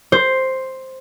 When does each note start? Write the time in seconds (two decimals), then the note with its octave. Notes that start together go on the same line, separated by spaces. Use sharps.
0.12 C5